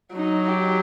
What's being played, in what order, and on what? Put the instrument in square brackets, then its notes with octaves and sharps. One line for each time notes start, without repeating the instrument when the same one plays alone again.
[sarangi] F#3 [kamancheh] D#4
[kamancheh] G4